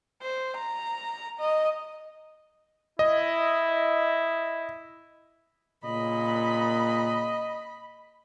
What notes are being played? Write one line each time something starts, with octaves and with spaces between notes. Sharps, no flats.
C5
A#5
D#5
E4 D#5
A#2 C#3 D#5 B5